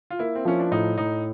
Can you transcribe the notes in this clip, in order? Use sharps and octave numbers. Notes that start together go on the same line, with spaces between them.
F4
A#3 E4
C4
F3 C#4
D4
A2 D#4
A2 D#4